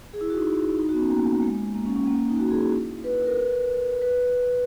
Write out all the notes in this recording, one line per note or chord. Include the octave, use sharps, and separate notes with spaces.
G#4
E4
F#4
D#4
D#4
B3 F#4
C#4
A#3
G#3
A#3
C#4
C#4
A#3
D#4
F#4
G#4
E4
B4
B4
A#4
B4
B4